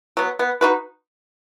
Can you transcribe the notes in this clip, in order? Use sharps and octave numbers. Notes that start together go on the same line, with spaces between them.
F#3 B3
B3
D#4 F#4 B4